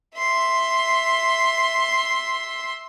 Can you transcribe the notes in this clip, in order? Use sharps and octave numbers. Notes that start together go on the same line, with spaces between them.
E5 C6